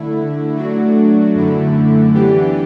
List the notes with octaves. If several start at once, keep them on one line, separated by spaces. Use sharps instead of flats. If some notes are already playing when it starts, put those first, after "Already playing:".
Already playing: D3 A3 E4
F#3 A3 D4 F#4
F#2 D3 A3 E4
E3 B3 D4 G4